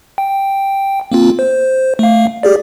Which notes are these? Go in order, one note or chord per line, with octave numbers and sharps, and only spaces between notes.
G5
A#3 C4 F4
C5
A3 F5
G4 G#4 D5